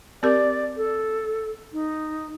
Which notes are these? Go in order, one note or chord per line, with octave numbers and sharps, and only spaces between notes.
C4 G4 A#4 D5
A4
D#4